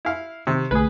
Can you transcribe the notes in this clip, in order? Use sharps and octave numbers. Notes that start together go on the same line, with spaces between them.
E4 F5
C3 D#3 G4 C#6
B1 D3 A3 G#4 B4